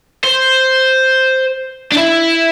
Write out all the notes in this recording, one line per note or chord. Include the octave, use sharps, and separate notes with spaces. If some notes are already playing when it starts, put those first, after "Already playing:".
C5
D4
E4